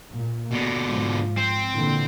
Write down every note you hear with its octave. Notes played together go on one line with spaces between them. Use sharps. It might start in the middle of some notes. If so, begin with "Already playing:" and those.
A#2
B2 D3
G#2 F3
C4
A#2 D3 E3